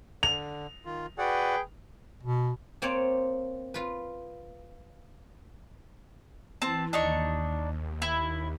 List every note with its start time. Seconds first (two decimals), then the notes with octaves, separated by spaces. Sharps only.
0.23 D3 F7
0.85 D#3 F4
1.18 F#4 G#4 B4 D5 F#5 G5
2.23 B2
2.82 A#3 C4 C#5 D5
3.74 F4 B4
6.62 E3 C4 A5
6.93 D#2 D4 D#4 C#6
8.02 E4